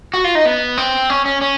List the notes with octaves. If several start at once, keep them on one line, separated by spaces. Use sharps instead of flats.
F#4
F4
D#4
B3
C4
C#4
C#4
C#4